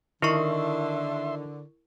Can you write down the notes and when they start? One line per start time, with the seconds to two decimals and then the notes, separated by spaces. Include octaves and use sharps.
0.22 D3 D#3 E4 A#4 E5 C6 C#6